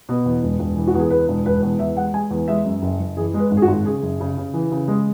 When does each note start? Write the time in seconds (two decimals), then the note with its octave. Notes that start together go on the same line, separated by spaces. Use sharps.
0.09 B2
0.26 E2
0.43 E1
0.59 E1
0.76 E3
0.87 F#4
0.94 E2
1.00 G#4
1.11 E2 B4
1.28 E1
1.45 E1 B4
1.63 E2
1.79 E2 E5
1.97 G#3 F#5
2.14 G#3 G#5
2.31 E2
2.48 G#3 E5
2.65 F#2
2.82 F#1
3.00 F#1
3.17 E3 G#4
3.34 G#3
3.39 B4
3.51 G#1
3.57 G#4
3.62 F#4
3.68 G#1
3.85 C#3 G#4
4.03 F#1
4.20 C#3
4.38 C#3
4.54 E3
4.72 C#3
4.88 G#3